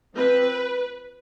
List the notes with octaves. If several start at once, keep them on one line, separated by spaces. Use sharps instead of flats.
F3 C4 B4